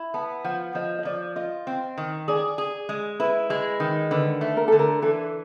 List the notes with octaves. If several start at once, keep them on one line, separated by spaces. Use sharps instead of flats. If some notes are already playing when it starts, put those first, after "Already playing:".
Already playing: E4
B3 A5
F3 F#5
F3 D#5
D#5
F3 D5
F4 D#5
C4
D#3
G#4 D5
G#4
G#3
E4 B4
G#3
D#3
D3 B4
A3
A#4
D3 A4
A#4
E3 A4